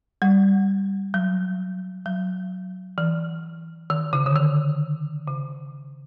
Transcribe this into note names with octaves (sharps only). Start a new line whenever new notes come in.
G3
F#3
F#3
E3
D#3
C#3
D3
D#3
C#3